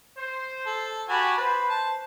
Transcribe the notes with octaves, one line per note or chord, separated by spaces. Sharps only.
C5
A4
F#4 G4 G#5 A5 B5
B4 C5
A5